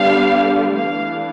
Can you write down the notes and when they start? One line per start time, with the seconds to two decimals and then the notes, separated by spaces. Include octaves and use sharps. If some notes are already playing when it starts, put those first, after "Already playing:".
Already playing: D3 G3 B3 D4 F5
0.75 E3 A3 D4 F5